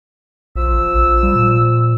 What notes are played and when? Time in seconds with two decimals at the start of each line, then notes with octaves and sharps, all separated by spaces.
0.56 A#1 F3 E6
0.74 A1
0.95 A#1
1.23 G3
1.36 A#2